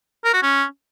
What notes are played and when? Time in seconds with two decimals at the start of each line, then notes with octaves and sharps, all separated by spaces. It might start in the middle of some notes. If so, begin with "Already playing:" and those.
0.25 A#4
0.34 F#4
0.43 C#4